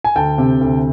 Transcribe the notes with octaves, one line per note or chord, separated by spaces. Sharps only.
G#5
D2 G5 A5
C3
D2